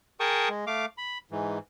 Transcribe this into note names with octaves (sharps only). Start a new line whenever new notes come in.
G#4 A#4 G5 A5 C#6 D#6
G#3
A3 F5 D6
B5
G#2 E3